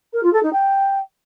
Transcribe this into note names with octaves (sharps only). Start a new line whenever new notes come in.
A#4
F4
A4
D#4
G5